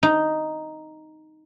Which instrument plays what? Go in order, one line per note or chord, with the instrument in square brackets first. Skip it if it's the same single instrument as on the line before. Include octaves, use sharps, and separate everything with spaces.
[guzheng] D#4